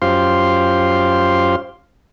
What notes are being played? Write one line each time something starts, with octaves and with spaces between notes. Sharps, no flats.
F#2 F4 G4 C5 F5 C6